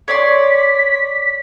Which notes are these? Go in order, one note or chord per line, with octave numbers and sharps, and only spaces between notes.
C#5 D5 C6 B6